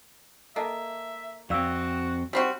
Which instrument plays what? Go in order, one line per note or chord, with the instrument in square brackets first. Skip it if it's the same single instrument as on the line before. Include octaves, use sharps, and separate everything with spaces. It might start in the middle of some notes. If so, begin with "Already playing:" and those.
[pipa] A#3 [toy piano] A4 D#5 A5 [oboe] E5
[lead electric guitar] F2 C4 [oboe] F#4 [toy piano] D5 F5 E6
[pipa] G3 C4 F#4 [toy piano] G4